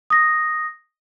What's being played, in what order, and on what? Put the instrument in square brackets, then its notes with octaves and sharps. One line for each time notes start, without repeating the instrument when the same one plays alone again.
[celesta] D#6 A#6